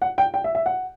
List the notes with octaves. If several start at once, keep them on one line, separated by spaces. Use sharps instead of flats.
F#5
G5
G5
E5
E5
F#5